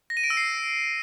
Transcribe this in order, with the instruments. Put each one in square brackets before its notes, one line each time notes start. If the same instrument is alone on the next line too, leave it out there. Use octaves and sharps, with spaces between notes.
[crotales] A#6
D#7
D7
E6
C7